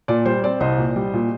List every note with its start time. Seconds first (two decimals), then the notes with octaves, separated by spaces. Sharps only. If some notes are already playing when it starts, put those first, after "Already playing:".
0.08 A#2 D5
0.25 G3 C5
0.44 C4 D5
0.60 C2 C5 D#5
0.78 A#2
0.96 G3
1.13 A#2